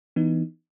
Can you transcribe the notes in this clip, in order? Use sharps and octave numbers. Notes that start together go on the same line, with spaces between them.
E3 B3 D#4